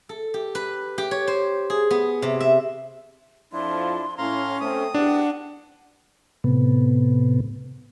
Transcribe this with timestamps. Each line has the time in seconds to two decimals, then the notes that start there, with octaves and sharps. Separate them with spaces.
0.09 A4
0.34 G4
0.55 B4
0.98 G4
1.11 C#5
1.27 C5
1.70 G#4
1.90 B3
2.22 C3
2.40 E5
3.53 F2 F3 D4 E4 C6
4.18 A2 C#4 F5 A#5 C6
4.60 A3 C4 D#6
4.94 E2 D4 G4 F#5
6.44 A2 C3 B3